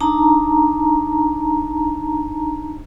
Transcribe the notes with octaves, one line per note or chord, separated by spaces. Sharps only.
D4 D#4 A5 A#5